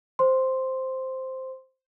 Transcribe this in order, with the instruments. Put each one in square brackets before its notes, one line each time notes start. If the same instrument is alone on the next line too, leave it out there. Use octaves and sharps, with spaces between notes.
[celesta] C5 C6